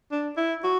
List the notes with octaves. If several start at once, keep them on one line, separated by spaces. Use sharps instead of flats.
D4
E4
F#4